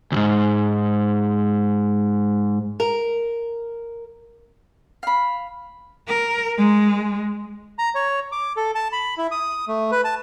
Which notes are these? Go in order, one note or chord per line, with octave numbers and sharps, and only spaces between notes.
D2 G#2
A#4
F5 B5
A#4
G#3
A#5
C#5
D6
A4
A5
B5
E4
D#6
A3
B4
A5